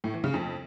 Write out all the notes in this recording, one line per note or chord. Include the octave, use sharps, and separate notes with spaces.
A2
E3
C#3
F2